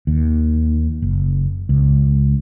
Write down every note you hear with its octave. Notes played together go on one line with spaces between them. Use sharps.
D#2
F#1
C#2